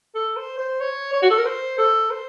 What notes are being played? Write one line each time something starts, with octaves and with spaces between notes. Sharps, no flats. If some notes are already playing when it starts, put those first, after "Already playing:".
A4
C5
C5
C#5
C#5
F#4
A4
A#4
C5
A4
C5